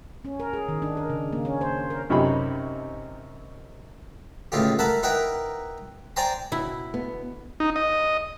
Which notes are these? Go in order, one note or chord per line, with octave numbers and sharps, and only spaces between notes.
C#4
A#4
G#4
D#3
D4
A#4
C#3
A#3
C#4
C5
A#4
F#2 C3 C#4 D#4 B5
C#2 A2 F4 G4
E4 A#4 F#5 A5 B5
D#4 E4 A#4 B4 F#5 G5
C5 D5 G5 G#5 A#5 C6
B2 E4
D3 B3
D#4
D#5